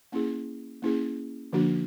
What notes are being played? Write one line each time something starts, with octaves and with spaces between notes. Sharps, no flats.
A#3 C#4 E4 G#4
A#3 C#4 E4 G#4
D3 F3 A#3 D4 F#4